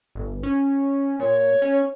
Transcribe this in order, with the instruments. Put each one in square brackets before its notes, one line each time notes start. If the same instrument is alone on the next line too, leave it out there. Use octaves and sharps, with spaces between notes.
[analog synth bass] G1
C#4
[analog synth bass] A#2 [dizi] C#5
[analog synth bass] C#4